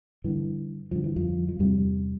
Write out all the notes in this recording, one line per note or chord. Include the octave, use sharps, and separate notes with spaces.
G2 D3 E3
G2 D3 F3
E3
F2 F3
F3
E2 G2 C3 G3